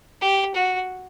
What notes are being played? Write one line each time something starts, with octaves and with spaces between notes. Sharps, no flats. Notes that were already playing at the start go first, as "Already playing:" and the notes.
G4
F#4